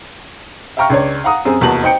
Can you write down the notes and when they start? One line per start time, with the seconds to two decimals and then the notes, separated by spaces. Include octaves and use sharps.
0.77 E5 F5 G5 A#5 C#6 F6
0.90 C#2 D4 C#5
1.24 F5 F#5 A#5 D#6
1.45 F#2 C4 G#4
1.61 F1 E2 A#3 F#4 A5 F#7
1.83 D#4 C5 G5 C#7